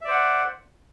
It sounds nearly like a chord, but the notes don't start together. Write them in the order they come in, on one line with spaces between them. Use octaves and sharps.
E5 D5 C5 F#5